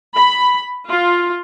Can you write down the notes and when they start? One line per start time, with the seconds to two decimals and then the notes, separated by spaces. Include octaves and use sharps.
0.16 B5
0.88 F4